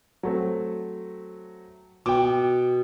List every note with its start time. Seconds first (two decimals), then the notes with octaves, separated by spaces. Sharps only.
0.23 F#3 A3 C4
2.06 B2 G5 D6